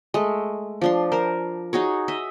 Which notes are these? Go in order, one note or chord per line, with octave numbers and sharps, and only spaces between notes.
G#3 A3
F3 D4 C6
A#4 C5
D#4 F#4 G#4 C#5
D#5 E5